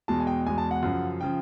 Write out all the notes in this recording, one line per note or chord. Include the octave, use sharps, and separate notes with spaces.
E2 B2 G#3 A5
G#5
G5
E2 B2 G#3 G#5
A5
F#5
F#2 C#3 F3
C#3 F3 G5